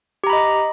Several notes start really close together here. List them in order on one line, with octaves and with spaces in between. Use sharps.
G4 A#5 B5 D#5